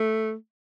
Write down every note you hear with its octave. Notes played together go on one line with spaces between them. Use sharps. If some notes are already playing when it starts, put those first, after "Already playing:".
Already playing: A3